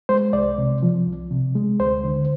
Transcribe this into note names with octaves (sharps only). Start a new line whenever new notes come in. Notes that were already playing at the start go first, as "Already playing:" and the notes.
G#3 C5
C2 D5
C3
F3
C2
C3
G#3
D2 C5
D3